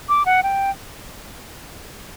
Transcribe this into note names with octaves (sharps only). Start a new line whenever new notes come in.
D6
F#5
G5